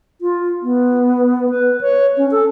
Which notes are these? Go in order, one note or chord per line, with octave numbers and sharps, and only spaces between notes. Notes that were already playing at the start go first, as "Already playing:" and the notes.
F4
B3
B4
C#5
C#4
A4